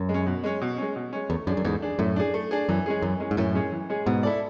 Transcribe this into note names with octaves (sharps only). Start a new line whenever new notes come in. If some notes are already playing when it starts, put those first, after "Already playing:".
Already playing: F#2
G#3
C#4
B2
G#3 C#4
B2
G#3 C#4
B2
G#3 C#4
E2 A3
F#2 D4 G#4
F#2
E2 G#2 A3
D4 G#4
F#2 A2 A3
D4 G#4
A3
D4 G#4
F#2 E3
G#3 C#4 G#4
F#2 E3
G#3 C#4 G#4
G#2
F#2 A2 E3
G#3 C#4 G#4
E3
G#3 C#4 G#4
G#2 B2 B3
E4 A4 D5